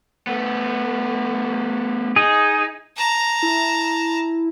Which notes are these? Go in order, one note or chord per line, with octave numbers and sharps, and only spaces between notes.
A3 B3
D#4 G#4
A5 A#5
E4